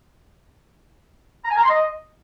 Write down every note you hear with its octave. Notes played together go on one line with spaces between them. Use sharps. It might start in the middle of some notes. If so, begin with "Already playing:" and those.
A#5
G#5
A#5
C6
D#5